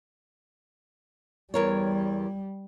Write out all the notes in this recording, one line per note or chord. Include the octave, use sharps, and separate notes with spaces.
E2 G3 A#4 C#5